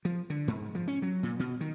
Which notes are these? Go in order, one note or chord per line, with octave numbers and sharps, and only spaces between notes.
F3
D3
G#2
F3
C#4
F#3
A#2
B2
D#3